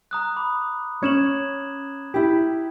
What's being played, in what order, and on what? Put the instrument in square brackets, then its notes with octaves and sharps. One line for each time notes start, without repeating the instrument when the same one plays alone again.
[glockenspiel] A#5 D#6 F#6
B5 D6
[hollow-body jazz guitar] C#4 C#5 [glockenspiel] G#6 E7 F#7
[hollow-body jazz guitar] E4 G4